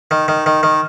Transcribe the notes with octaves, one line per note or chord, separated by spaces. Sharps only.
D#3
D#3
D#3
D#3